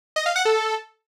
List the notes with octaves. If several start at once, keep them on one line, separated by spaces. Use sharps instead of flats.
D#5
F5
F#5
A4